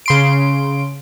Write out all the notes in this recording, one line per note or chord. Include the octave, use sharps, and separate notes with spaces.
C#3 C6 D7